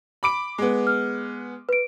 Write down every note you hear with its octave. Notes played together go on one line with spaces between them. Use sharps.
B5 D6 D7
G#3 B3
F6
B4 D7